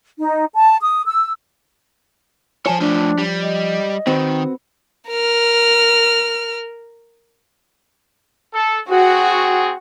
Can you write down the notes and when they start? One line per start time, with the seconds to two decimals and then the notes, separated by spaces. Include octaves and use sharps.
0.19 D#4
0.54 A5
0.82 D#6
1.06 E6
2.66 F3 F4 C#5 G#5 A5
2.81 A3 D4 F4
3.18 G3
3.42 D#5
4.07 D#3 C4 F#4 B4
5.09 A#4 F6
8.53 A4
8.90 C4 F#4 G#4